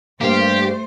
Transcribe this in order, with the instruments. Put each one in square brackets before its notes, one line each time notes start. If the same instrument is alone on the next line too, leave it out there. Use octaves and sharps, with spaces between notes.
[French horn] G2 [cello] A3 C5 [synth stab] A#3 F5 [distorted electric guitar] G4